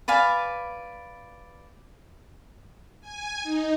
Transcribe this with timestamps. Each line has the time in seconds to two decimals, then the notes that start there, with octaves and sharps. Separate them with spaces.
0.08 B4 D5 F5 G#5
3.01 G#5
3.43 D#4